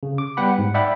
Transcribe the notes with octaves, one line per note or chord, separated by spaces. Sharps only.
C#3
D6
G3 B3 F#5 G5 B5
G#2
D5 E5 F#5 G5 B5 D6